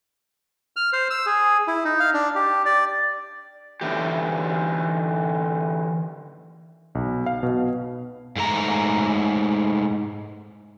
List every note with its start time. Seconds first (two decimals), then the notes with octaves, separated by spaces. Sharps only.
0.76 F6
0.93 C5
1.11 E6
1.26 G#4
1.67 E4
1.85 D#4
2.00 F5
2.14 D4
2.35 G4
2.65 D5
3.81 D3 E3 G4
6.95 B1
7.26 F5
7.43 B2
8.36 G#2 A3 A#5